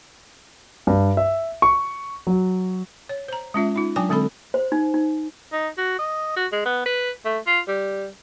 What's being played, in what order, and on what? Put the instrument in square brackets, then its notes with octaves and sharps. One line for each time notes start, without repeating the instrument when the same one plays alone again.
[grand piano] G2
E5
C#6
F#3
[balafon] C#5
C5 A#5
G#3 C#4 F4 E5
D#4 F4
F#3 D4 G5 G#5 D6
D3 G#3 C4 A4 B5
[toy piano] C5
D#4
D#4
[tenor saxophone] D#4
F#4
D#5
F#4
G#3
B3
B4
A3
F4
G3